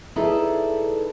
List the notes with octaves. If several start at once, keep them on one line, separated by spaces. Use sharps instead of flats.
D#4 E4 G#4 A4 B4 D5